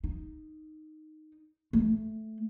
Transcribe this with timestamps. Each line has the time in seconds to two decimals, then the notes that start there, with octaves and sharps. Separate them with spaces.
0.04 D#4
1.73 A3